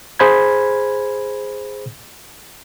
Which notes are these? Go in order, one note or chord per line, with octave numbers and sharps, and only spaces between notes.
G#4 C5 B5 G#6